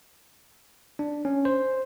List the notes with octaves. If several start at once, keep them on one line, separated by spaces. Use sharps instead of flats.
D4
C#4
C5